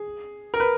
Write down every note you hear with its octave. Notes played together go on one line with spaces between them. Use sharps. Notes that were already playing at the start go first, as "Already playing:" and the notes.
Already playing: G#4
A#4
B4